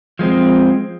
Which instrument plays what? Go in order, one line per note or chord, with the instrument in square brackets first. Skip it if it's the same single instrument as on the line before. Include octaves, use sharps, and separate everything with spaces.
[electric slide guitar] F3 G#3 A3 C4